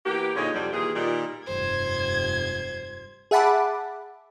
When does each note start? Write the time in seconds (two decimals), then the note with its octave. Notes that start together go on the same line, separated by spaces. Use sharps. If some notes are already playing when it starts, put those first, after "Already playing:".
0.06 E3 A#3 B3 G4
0.36 A#2 D3 F3 G#3 D#4 C#5
0.55 F2 C3 F#3 G3
0.72 D#2 A#2 E3 G#4
0.96 A#2 D#3 G3
1.47 F1 G2 C5 G#6
3.31 G#4 E5 F#5 A5 B5 D6